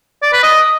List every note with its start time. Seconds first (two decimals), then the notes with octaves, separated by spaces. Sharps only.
0.22 D5
0.33 B4
0.43 D#5